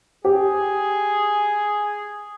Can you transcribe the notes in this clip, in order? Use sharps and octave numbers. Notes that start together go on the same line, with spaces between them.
G4 G#4